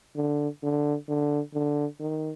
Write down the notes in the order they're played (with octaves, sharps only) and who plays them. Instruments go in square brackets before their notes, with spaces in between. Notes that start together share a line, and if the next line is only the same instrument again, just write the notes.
[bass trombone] D3
D3
D3
D3
D#3